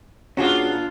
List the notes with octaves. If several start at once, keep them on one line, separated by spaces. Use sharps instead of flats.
A#2 C#4 D4 F4 F#4 G#4